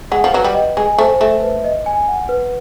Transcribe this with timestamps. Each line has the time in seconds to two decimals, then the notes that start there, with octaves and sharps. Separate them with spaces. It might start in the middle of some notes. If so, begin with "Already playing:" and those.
0.12 G#3 F#5
0.24 F3
0.33 F#3 B4
0.44 G3
0.55 D#5
0.77 G#3 G#5
0.98 A3 C5
1.21 A3 E5
1.42 B4
1.64 D#5
1.86 G#5
2.08 F#5
2.29 B4